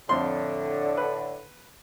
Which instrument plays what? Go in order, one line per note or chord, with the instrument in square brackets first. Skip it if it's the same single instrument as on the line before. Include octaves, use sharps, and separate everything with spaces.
[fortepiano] F2 C6 [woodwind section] A2 D3
[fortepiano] B4